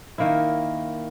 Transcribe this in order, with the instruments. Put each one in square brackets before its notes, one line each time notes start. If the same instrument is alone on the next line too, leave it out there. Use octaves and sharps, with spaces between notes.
[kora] D#3 A#3 E4